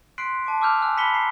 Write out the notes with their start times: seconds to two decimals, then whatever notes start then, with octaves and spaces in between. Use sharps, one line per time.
0.18 C6 F#6 B6 C7 D7
0.45 A5 D6 D7
0.61 A5 D6 E6 F6 G6 F7
0.81 G#5 E6 F#6
0.97 A5 B5 B6 C#7 E7 G7
1.13 A#5 C7